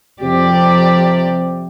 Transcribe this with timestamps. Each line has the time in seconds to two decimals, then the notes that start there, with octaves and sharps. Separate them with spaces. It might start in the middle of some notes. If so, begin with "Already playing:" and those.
0.23 F2 C3 G4 D5